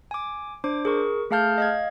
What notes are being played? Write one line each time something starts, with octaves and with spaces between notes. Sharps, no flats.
G#5 D6
D4 C5 D6
G#4 A#4 C#6
A3 G#4 F5 A5 F6 G6
D#5 F5 G#6